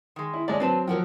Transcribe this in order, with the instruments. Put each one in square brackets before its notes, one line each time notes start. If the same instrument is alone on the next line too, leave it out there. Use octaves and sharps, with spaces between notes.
[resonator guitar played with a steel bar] D#3 G#3
[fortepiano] E4
[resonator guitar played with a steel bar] G2 A3 [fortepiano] G#3 C#5 D5
[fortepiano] F#3 C4 [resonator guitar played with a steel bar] D4 B4 A5
[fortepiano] F3 F#3 [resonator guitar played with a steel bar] A#4 F#5 G5